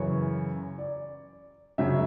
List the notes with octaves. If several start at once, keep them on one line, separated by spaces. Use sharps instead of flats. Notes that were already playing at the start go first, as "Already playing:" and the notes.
Already playing: F#2 C#3 E3 C#5
D5
F#2 C#3 F#3 E5